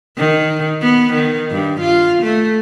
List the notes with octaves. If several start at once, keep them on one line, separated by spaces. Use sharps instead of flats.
D#3
B3
D#3
G2
F4
A3